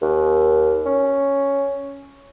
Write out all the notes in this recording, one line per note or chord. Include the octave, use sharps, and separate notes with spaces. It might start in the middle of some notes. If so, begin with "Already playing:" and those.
D#2
C#4